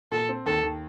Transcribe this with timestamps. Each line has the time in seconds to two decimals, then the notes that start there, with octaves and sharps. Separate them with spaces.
0.12 A#2 A4
0.29 C4
0.46 D#2 A4
0.63 D#2